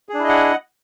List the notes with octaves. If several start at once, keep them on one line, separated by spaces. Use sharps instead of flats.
D4 E4 G#4 D#5 F#5